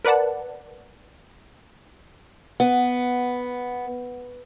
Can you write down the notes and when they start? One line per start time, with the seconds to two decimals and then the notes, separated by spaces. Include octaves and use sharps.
0.05 A#4 B4 D5 F#5 A5
2.60 B3 F#5